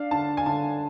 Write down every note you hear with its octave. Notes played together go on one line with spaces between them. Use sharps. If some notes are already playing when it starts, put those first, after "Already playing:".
Already playing: D4 F5
D3 A5
G#5
D3 A5